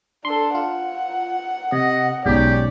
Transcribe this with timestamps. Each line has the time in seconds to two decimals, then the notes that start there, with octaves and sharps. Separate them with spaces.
0.25 D4 A4 C6
0.55 F4 F#5
1.72 C3 D#5
2.26 B1 G#2 C#4 G4 D5